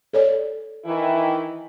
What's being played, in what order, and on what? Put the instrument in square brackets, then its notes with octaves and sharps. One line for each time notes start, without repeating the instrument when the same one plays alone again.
[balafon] A4 C#5 D5
[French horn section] D#3 E3 E4